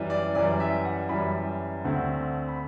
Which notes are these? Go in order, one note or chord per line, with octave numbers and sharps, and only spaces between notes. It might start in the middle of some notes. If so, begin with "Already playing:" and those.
Already playing: F#2 E3 G3
D5
F#2 E3 G3 D5
E5
F#5
F#2 E3 G3 B5
D2 D3 A3 C4
B5